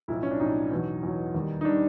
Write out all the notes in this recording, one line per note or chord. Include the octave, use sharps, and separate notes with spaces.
B1 A2 F3 E4
C#4
D4
B1 A2 F3 D#4
E2 B2 F#3
E2 B2 F#3
D#2 D#3 G3
D#4
D#3 G3 D4